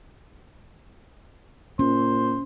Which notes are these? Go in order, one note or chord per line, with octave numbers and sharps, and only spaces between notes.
A#2 C#4 C5